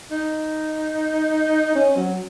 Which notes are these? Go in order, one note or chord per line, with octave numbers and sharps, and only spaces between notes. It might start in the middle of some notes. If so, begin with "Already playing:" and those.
D#4
C#4
F#3